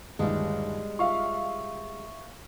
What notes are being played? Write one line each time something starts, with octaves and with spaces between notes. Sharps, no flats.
G1 D#2 G3 G#3
F4 E5 F5 C#6